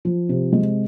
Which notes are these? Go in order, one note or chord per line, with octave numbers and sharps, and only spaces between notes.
F3
C3
G#3